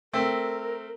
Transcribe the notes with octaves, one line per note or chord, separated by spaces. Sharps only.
A3 C4 A#4